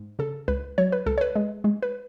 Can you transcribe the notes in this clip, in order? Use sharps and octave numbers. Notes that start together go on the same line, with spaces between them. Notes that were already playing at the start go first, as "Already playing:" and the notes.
Already playing: G#2
C#3 A4
C#2 B4
F#3 C#5
B4
C#2 A4
C#5
B4
G#3
G#3
B4